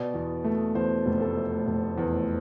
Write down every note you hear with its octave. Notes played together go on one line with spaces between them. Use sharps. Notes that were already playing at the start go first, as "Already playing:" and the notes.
Already playing: B2 D5
E2
A3
E2 C5
F1
A4
A3
F1
E2